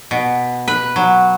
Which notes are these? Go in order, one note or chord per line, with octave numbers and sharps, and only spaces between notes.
B2
B4
F#3